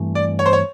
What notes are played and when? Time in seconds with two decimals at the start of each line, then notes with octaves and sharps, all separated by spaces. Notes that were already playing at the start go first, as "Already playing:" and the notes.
Already playing: G2 E3 A3 C4
0.15 D5
0.39 C#5
0.46 C5
0.53 C#5